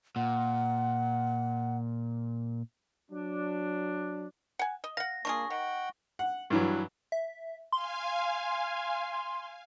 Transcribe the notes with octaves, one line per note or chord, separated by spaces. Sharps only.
A#2 F#5
F#3 D4
F#5 G#5
D#5
F5 F#5 A#6
A#3 D4 F4 G#4 C#6
D#3 F#5 G5
F#5
G2 E3 F#3
E5
F5 G#5 C6